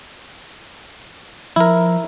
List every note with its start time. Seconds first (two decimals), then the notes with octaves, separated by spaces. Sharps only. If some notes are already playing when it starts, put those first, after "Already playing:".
1.56 F3 E4 A#4